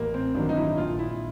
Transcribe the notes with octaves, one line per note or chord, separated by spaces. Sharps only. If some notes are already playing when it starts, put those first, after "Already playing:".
Already playing: A1 A#3
C4
G2 D#3 F#3 D4
D#4
E4
A#1 F4
E4